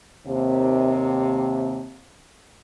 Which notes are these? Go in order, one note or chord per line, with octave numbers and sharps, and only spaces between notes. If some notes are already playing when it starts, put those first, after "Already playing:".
D#2 C3